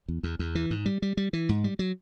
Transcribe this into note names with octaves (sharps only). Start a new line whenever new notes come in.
E2
E2
E2
E3
G#2
G3
G3
G3
E3
G#2
G3
F#3